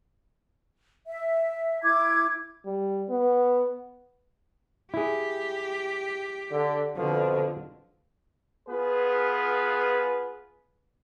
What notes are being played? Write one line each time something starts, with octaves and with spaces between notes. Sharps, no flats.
E5
E4 D6 G#6
G3
B3
E4 G4 G#4
D3
F2 B2 D3 F3
B3 F4 G#4 B4